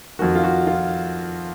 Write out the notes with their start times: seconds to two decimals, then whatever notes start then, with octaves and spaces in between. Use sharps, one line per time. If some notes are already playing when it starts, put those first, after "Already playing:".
0.19 F2 D#3 F#4
0.35 F4
0.44 F#4
0.67 F4